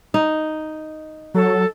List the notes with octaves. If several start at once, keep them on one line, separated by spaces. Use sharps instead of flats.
D#4
F#3 A4